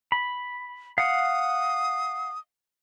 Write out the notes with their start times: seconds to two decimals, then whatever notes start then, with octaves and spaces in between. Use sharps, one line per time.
0.12 B5
0.98 F5 F#5 D#6